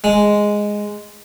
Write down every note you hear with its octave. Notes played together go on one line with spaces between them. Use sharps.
G#3